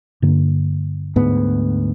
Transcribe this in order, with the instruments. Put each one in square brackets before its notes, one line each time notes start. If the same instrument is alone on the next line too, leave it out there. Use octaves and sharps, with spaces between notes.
[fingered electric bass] G2 D3 A#3
[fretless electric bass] D2 G#2 B3